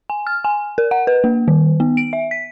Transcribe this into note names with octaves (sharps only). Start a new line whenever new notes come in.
G#5
F6
G#5
A#4
F#5
B4
A#3
D#3
B3
D7
E5
B6